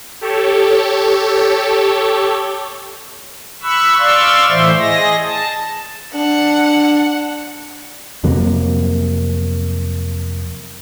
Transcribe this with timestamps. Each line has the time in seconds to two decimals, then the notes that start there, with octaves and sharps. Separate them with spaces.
0.21 G4 A4 C#5
3.62 B5 C#6 E6 F#6
3.99 D5 F5 C6 C#6 E6
4.48 A2 E3 C5 E5 C6
4.79 G#4 D#5 A#6
5.23 A5
6.14 D4 F#5
8.24 F2 C3 F#3 A#3